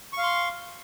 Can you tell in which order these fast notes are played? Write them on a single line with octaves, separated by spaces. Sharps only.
C#6 F5 C6